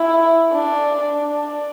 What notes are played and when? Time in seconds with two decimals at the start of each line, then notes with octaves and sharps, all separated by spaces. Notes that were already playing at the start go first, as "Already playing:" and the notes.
Already playing: E4
0.53 D4
1.24 D4